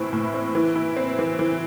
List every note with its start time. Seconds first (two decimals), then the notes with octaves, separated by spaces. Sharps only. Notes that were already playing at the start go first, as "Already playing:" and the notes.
Already playing: A2 E3 C4 E4
0.13 A2
0.34 C4
0.55 E3
0.76 E4
0.97 C4
1.19 E3
1.39 E3